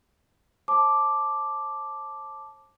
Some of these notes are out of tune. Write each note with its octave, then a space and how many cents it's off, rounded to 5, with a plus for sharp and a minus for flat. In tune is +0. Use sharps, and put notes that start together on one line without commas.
C5 +45 A5 -10 D6 +0